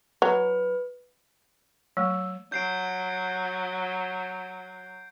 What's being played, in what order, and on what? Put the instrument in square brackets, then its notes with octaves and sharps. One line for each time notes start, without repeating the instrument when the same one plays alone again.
[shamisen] F#3 [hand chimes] B4
[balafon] F#3 A3 [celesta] E6
[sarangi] F#3 [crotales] G6 C7 D7